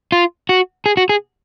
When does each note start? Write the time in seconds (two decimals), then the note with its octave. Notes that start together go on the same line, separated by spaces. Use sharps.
0.12 F4
0.49 F#4
0.86 G#4
0.97 F#4
1.09 G#4